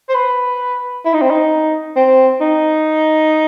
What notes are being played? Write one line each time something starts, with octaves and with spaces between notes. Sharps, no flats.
C5
B4
E4
D#4
C4
D#4
C4
D#4